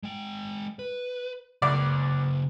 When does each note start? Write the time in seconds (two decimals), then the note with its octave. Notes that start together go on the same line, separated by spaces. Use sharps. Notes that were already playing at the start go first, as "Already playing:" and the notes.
0.03 G#3 G5
0.79 B4
1.62 C#2 C#3 A#3 D5